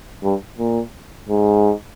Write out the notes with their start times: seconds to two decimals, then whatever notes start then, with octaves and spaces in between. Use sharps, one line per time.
0.23 G2
0.58 A#2
1.29 G#2